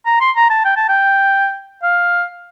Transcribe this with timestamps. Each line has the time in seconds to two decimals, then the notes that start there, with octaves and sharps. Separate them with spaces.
0.06 A#5
0.20 C6
0.36 A#5
0.50 A5
0.65 G5
0.77 A5
0.89 G5
1.83 F5